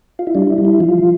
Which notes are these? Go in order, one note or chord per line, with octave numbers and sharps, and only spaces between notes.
F4
E4
G3 D4
E4
G3
E4
F3 F4